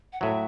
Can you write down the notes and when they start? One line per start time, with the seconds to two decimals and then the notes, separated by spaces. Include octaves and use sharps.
0.12 F#5
0.21 A2 F#3 E5